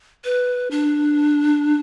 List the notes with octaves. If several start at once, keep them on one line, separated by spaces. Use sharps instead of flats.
B4
D4